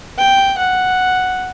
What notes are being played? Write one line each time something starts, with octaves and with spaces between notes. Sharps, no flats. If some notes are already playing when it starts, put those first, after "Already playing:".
G5
F#5